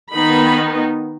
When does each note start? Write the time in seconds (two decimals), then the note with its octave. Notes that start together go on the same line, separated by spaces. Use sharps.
0.13 D#3 B3 D#4 B5